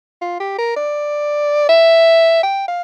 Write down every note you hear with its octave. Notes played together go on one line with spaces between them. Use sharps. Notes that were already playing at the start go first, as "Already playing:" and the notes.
F4
G4
A#4
D5
E5
G5
F5